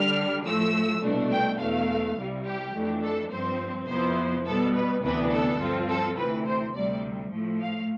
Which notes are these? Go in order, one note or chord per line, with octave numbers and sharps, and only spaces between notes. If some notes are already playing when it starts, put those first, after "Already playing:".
Already playing: D3 G3 D4 F6
A2 F3 A3 E6
C2 B2 A3 D4
G5
E2 B2 A3 F5
C2 C3 G3
G4
F2 E3 A3 D4
A4
G2 F3 C4 C5
F2 C3 F3 B3 E4 C5
B2 G3 B3 A4
B4
D2 C3 E3 B3 D4 B4
A4
G2 F3 C4 F4
A4
D2 C3 E3 B4
C5
D2 C3 G3 D5
A2 F3 A3
F5